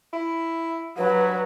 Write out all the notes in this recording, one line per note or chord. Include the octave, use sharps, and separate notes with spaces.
E4
G2 F#3 B4